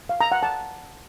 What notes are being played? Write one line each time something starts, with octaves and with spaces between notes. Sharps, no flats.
F5
A#5
F#5
A5